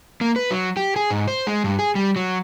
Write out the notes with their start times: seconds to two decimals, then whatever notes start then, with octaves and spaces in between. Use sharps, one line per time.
0.21 A#3
0.36 B4
0.51 F#3
0.77 G4
0.96 G#4
1.10 G#2
1.28 C5
1.47 G#3
1.64 G2
1.79 G#4
1.95 G3
2.16 F#3